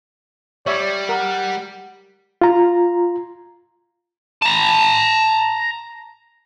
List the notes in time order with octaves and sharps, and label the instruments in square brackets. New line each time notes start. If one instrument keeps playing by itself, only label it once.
[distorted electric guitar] G3 [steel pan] C#5 E5 [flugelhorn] D5
[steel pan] A#4 [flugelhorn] F#5
[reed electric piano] F4 A#5
[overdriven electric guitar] A5 A#5